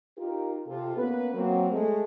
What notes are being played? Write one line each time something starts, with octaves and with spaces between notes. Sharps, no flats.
D#4 F4 G4 A#4
C3 F4 A4
A#3 B3 C#4 B4
F#3 A#3 C4
G#3 A3